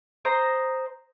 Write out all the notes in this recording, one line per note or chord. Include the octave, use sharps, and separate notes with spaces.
C5 D#5 A#5